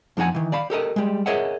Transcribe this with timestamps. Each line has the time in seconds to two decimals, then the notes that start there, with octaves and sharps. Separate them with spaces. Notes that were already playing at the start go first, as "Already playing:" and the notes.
0.17 F2 F3 D#4 F#5 G#5
0.35 D#3 E3
0.52 D5 F5 B5
0.70 G4 A4 A#4 D#5
0.96 G3 G#3
1.26 G#4 A#4 C#5 D#5 E5 F#5